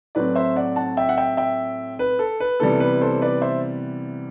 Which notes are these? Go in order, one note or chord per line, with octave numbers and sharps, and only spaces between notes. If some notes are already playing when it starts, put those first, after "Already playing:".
A2 F#3 C4 B4 D5
C5 E5
D5 F#5
F#5 A5
E5 G5
F#5
E5 G5
E5 G5
B4
A4
B4
C3 E3 G3 B3 A4
B4
A4 C5
B4 D5
C5 E5